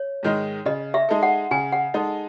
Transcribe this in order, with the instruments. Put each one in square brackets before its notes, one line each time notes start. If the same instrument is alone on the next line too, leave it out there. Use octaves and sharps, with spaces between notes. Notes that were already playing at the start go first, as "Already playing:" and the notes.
Already playing: [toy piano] C#5
[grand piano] G#2 D#3 G#3 D#4
[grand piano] C#3 [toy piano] D#5
[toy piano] E5
[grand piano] G#3 D#4 A4
[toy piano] F#5
[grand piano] C#3 [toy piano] G#5
[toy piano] F#5
[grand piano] G#3 D#4 A4 [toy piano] D#5